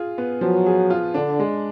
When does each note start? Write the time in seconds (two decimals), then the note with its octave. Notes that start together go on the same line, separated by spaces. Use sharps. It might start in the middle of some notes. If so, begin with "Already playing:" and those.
Already playing: F4 G#4
0.18 B3
0.41 F3 F#3
0.66 G#4
0.90 F4
1.14 D3 D4
1.40 G#3